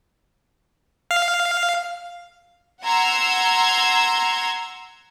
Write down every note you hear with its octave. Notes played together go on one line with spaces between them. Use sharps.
F5
F#5 A#5 C6 E6 G#6